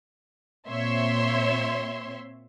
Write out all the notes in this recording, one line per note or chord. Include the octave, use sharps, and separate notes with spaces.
A#2 C4 C#5 E5 C6